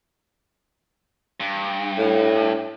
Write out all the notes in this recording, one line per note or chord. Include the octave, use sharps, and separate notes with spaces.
G2
A2